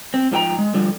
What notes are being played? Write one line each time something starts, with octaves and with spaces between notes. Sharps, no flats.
C4
G#2 F3 A4 G5 A#5
G#3
D3 F3 G3